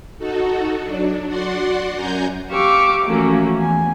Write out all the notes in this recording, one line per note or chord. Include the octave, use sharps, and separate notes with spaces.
D#4 F#4 A4
F#3 D4
F#4 D5 F#5 C6
F#2 G#5 A#5 G6
G4 F5 C#6 D6 E6
E3 F3 A3 A#3 C#4 F#4
E2 G#5